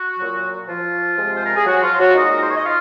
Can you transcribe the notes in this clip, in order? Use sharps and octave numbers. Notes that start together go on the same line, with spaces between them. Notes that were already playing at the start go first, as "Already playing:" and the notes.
Already playing: F#4
A#2 F#3
F3 F4
C3 F3 G#3
C5
A#4
G#4
F#3 F#4
F3 F4
F#3 F#4
A#2 G#3 D#4 D#5
A#4
C5
C#5
D#5
F4 F5